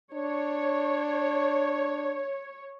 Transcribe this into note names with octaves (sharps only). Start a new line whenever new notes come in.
D4 C#5